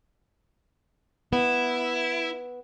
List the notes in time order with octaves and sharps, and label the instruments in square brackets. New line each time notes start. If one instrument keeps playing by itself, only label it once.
[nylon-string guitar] B3 [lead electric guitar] E4